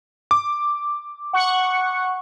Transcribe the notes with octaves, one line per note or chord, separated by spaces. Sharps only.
D6
F#5 C#6